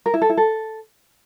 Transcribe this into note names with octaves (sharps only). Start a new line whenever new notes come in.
A#4
E4
A4
E4
A4